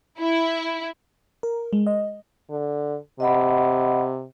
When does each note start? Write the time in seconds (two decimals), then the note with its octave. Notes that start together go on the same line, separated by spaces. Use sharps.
0.21 E4
1.43 A#4
1.73 G#3
1.87 D#5
2.50 D3
3.20 C3 D#5 F#5 B5